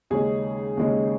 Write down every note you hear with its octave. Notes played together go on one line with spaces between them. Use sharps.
D#2 C#3 G#3 C#4 G#4
D#2 C#3 G#3 C#4